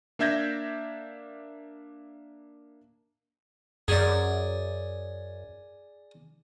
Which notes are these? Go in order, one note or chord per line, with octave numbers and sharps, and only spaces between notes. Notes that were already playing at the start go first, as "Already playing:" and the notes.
A#3 D4 E5 G6 G#6 A#6
F#2 G#4 D5